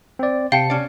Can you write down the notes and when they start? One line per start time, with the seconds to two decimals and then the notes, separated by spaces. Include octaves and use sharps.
0.19 C4 D5
0.52 C3 F5 G5 A5 C#7
0.70 C#4 D5